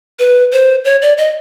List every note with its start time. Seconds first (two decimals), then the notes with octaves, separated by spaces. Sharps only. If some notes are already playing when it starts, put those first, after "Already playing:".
0.19 B4
0.52 C5
0.85 C#5
1.02 D5
1.18 D#5